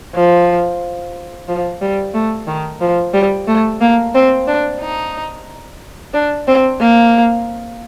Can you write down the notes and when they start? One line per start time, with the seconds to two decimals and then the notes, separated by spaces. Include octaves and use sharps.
0.14 F3
1.48 F3
1.81 G3
2.14 A3
2.47 D#3
2.81 F3
3.14 G3
3.48 A3
3.81 A#3
4.14 C4
4.47 D4
4.81 D#4
6.14 D4
6.48 C4
6.80 A#3